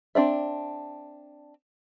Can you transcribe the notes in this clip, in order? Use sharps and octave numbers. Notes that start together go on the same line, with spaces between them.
C4 D4 D5 E5